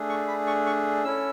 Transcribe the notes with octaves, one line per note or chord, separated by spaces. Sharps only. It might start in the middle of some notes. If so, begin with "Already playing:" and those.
Already playing: A3 D4 G#4
C#6
B5
C#6
C#6
C#4 E4 A4 E6